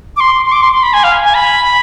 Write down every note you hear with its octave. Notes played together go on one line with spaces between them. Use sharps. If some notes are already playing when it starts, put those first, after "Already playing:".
D6
C6
C6
D6
C6
C6
B5
G#5
F5
G#5
B5